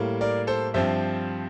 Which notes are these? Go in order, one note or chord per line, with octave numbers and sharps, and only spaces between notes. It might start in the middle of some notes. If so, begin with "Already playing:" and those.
Already playing: A2 G3 A#3
A#4 D5
A4 C5
G2 F3 C4 C5 E5